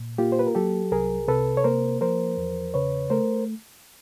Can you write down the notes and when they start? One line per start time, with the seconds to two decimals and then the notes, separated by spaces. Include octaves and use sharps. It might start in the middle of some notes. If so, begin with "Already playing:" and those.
Already playing: A#2
0.18 A#3 F4 G4
0.32 C5
0.39 B4
0.47 A#4
0.55 F#3 G4 A4
0.92 C2 G#4 A#4
1.28 C3 A4 B4
1.57 C#5
1.64 A#3 A#4 C5
2.01 F3 A#4 C5
2.38 E2
2.74 C#3 B4 C#5
3.10 A3 A#4 C5